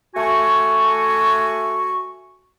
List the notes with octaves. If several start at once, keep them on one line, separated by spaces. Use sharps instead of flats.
A3 F#4 G#5 C#6